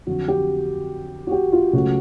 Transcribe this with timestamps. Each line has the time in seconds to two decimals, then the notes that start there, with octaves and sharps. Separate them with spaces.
0.07 F2 D3 F#3 F#4
0.28 G4
1.27 F#4
1.32 G4
1.52 F4
1.73 C#2 C#3 F#3 A3 F#4